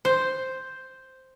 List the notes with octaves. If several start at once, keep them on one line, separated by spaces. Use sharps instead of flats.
C5